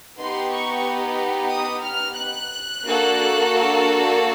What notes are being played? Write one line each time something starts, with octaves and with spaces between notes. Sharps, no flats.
B3 D#4 G4 C6
C#6
D#6
F6
F#6
A#3 D4 F#4 A4